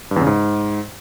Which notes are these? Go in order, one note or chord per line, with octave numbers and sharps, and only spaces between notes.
G2
E2
C#3
G#2